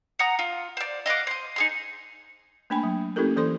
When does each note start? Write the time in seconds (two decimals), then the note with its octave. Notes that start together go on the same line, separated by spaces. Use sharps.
0.19 F#5 A#5 D#6
0.39 F4
0.77 C5 D5
1.06 D#5 F5 F#5 D6
1.27 C5 D#5
1.56 D#4 G#4 C6
2.70 A3 A#3 D4 G5 G#5 B5
2.83 F#3
3.16 A#3 C#4 E4 G4 A4 A#4
3.36 E3 A4 C5 C6